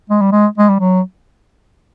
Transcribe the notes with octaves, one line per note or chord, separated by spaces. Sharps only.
G#3
G3
G#3
G#3
G3
F#3